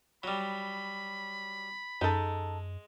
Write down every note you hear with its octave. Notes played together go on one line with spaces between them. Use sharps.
F#3 G3 B5
F#2 G#3 D#4 A4